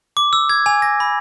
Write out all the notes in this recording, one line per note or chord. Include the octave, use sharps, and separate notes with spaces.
D6
E6
G#6
G#5
A#6
B5